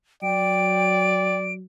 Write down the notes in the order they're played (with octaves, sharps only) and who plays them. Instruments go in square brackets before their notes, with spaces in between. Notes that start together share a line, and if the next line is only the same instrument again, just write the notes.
[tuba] F#3 [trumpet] D5 [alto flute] G5 [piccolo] D7